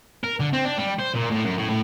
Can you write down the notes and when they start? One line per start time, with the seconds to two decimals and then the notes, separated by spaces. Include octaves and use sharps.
0.24 A#4
0.40 D3
0.53 C4
0.65 D4
0.78 G3
0.99 C5
1.15 A#2
1.30 A2
1.44 F#2
1.57 A2
1.70 A2